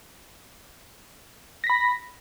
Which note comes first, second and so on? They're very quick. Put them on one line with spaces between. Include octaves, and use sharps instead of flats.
A#6 B6 B5